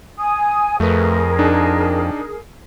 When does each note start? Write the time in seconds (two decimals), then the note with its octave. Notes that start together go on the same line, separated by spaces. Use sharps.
0.18 G#5 D#6
0.80 F2 A3 G#4 A#4 B4
1.39 D4 D#4